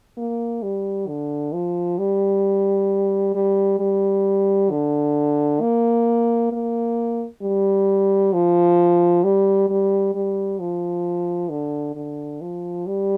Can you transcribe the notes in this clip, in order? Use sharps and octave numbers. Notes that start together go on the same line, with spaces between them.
A#3
G3
D3
F3
G3
G3
G3
D3
A#3
A#3
G3
F3
G3
G3
G3
F3
D3
D3
F3
G3